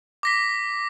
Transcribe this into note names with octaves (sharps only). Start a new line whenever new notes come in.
D6 A#6 B6